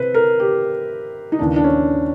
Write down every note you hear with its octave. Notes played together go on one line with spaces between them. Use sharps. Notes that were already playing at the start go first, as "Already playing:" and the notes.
Already playing: C3 B4 C5
A#4
G4
D#4
D#2 C#3 E3 D4
D4
C#4